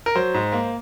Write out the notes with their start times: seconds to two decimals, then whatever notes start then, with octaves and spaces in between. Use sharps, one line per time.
0.06 A#4
0.15 F#3 C5
0.34 G#2
0.52 A#3